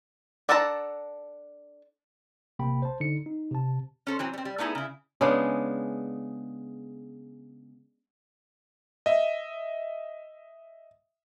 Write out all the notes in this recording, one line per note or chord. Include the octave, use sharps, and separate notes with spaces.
D4 A4 F#5 A5 A#5
A1 C3 A#3 G5 B5
C5 A5
D3 D#4 C#7
D#4
C3 A5
C#4 A4 C5
E3 F#3 C4
G3 C4
G3
A3 B3 D#4 E4 G#4
C#3 E4
C#3 G#3 B3 D4
D#5 E5